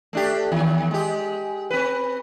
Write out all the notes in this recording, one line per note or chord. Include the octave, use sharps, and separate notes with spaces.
A3 D4 G4
D#2
G#3 G4
C4 B4